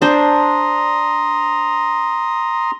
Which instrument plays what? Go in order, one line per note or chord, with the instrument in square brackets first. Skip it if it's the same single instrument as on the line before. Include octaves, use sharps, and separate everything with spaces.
[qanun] D4 C5 [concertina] A#5 C6 D#6